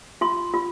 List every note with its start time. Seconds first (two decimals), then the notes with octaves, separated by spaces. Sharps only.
0.21 F4 C6
0.54 F4